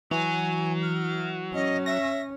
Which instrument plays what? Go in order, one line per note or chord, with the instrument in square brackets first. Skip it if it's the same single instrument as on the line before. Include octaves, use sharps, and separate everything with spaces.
[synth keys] E3 [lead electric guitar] F#3 [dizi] G#5
[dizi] F6
[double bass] C#4 [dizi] D#5
[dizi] E5 [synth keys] A#6